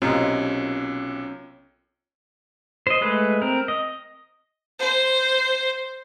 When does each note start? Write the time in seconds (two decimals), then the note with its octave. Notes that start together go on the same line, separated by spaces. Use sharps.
0.02 B1 C3 C#4 F4 A#4 D#5
2.87 C5 D#5
3.01 G#3 A3 B4
3.41 C4 A#4
3.68 D#5
4.79 C5